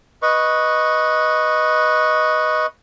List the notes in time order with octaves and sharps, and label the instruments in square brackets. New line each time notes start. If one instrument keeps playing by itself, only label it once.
[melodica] B4 D#5 C#6